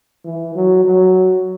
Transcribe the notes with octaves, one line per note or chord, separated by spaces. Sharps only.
E3
F#3
F#3